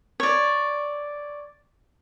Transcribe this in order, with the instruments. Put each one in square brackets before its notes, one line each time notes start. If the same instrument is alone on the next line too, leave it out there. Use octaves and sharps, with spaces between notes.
[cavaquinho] C#5 D5